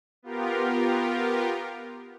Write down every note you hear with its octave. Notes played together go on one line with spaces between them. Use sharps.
B3 F4 G4 A#4